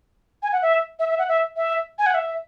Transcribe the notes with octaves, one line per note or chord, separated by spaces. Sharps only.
G#5
F#5
E5
E5
E5
F#5
E5
E5
G#5
F#5
E5